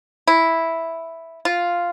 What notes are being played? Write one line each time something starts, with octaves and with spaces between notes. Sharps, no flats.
E4
F4